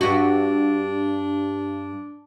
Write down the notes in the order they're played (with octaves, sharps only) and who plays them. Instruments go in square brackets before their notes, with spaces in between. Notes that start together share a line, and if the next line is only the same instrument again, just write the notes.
[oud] G2 F#4 [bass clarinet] D4